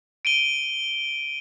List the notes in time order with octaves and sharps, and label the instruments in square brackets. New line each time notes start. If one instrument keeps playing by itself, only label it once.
[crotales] D7 D#7 G7